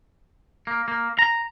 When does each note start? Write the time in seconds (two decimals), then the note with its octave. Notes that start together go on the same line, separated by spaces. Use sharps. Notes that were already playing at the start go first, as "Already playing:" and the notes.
0.67 A#3
0.88 A#3
1.19 A#5